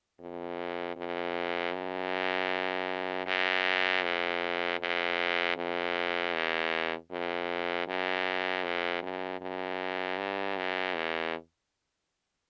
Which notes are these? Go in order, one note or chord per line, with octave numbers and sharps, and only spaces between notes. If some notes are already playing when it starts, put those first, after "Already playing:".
F2
F2
F#2
F#2
F2
F2
F2
E2
F2
F#2
F2
F#2
F#2
G2
F#2
E2